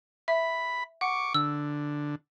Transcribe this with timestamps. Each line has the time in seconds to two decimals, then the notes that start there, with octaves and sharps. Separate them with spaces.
0.28 E5 B5
1.01 F#5 C#6 D6
1.34 D3 E6